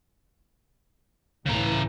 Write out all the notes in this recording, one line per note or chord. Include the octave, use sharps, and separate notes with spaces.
C#2 A2 C#3 E3 A#5